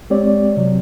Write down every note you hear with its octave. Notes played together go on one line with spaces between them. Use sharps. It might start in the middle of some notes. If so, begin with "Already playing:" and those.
G#3 C4 G4 C#5 D5
C3 F#3